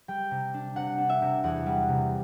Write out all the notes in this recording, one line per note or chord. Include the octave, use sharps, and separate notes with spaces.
G3 G5
C3
D4
C3 F#5
D4
E5
C3
E2 F#5
G3
C3